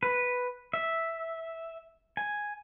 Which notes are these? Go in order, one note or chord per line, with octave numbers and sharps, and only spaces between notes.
B4
E5
G#5